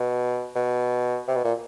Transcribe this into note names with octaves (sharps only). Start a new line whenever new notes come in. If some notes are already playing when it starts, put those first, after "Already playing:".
Already playing: B2
B2
C3
B2
A#2